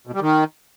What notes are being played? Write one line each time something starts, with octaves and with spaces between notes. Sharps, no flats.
B2
G3
D#3